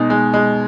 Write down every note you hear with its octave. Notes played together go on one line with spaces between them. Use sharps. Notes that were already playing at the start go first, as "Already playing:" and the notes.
Already playing: B2 G#3 D#4
G#3
G#3